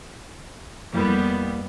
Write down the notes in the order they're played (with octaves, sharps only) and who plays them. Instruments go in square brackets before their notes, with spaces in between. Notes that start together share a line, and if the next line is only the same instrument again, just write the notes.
[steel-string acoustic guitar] F2 A#3 E4 [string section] G3 B3